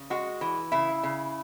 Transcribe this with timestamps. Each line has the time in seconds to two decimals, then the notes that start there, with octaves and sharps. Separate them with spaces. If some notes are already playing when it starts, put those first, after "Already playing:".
Already playing: C#3
0.10 G#3 F#4
0.41 E3
0.72 C#3 E4
1.03 C#3